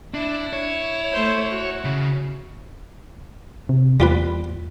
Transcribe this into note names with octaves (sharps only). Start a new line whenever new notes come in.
D4 E4
C#5
A3 C5
F#4
C#3
C3
E2 G3 F4 B4